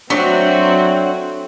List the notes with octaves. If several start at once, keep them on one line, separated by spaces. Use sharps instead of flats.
F#3 A3 C4 D4 F#4 C#5